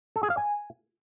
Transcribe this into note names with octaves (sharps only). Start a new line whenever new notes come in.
A4
G#4
F5
G#5